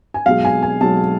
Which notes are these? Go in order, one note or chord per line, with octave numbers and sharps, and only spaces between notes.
G#5
B1 B2 G#3 F5
G#5
G#5
B1 B2 G#3 A5